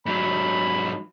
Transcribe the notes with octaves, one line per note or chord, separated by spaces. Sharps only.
G#2 F#3 B5